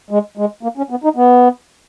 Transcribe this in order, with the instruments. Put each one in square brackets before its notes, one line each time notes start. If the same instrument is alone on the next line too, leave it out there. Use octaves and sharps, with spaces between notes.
[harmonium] G#3
G#3
A#3
C#4
B3
D#4
B3